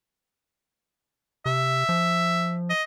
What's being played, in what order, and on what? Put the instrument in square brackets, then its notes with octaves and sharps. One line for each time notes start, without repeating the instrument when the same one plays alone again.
[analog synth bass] C3 [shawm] E5
[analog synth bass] F3
[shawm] D#5